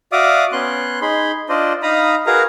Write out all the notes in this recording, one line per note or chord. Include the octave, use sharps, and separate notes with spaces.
F#4 D5 E5 F5 D6 D#6
B3 C#4 C6 F#6
D#4 G#4 B5 C6
D4 F4 C5 D5 D#5
D#4 F5 A#5 B5 D#6
F#4 G#4 A#4 B4 F5 A#5